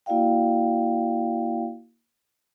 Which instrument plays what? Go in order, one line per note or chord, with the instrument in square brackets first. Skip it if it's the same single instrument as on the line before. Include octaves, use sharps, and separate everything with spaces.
[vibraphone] A#3 E4 F#4 D5 F5 G5